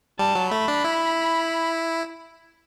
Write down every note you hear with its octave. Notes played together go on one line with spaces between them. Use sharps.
G3 A5
F#3
A3 B5
D4
E4